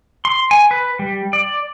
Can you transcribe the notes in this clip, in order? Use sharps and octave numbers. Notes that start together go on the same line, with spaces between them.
C6
G#5
B4
G3
D5